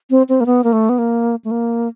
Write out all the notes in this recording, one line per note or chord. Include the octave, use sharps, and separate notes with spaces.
C4
C4
A#3
B3
A#3
A3
B3
A#3
A3
A#3